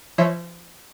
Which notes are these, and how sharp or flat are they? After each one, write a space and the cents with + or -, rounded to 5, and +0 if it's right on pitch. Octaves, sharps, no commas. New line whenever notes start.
F3 -30 C#5 -25 E5 +0